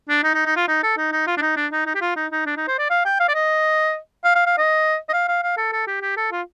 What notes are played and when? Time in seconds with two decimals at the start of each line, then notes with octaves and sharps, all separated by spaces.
0.09 D4
0.24 D#4
0.34 D#4
0.46 D#4
0.56 F4
0.68 D#4
0.83 A4
0.97 D#4
1.12 D#4
1.27 F4
1.37 D4
1.41 D#4
1.56 D4
1.72 D#4
1.86 D#4
1.95 G4
2.01 F4
2.16 D#4
2.31 D#4
2.46 D4
2.57 D#4
2.68 C5
2.79 D5
2.90 F5
3.05 G5
3.20 F5
3.28 D5
3.34 D#5
4.24 F5
4.35 F5
4.46 F5
4.58 D#5
5.09 D#5
5.13 F5
5.28 F5
5.43 F5
5.57 A4
5.72 A4
5.87 G4
6.02 G4
6.17 A4
6.31 F4